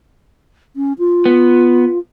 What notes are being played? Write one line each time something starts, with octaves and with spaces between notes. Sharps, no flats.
C#4
F4
B3